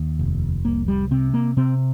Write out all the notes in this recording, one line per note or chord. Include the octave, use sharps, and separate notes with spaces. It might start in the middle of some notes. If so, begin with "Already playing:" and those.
Already playing: D#2
F1
C2 A#3
G3
C3 C4
A#3
C3 C4